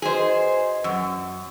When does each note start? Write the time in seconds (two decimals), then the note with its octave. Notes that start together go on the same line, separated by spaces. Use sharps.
0.02 F#4 G#4 B4 C5 D#5
0.84 F#2 E6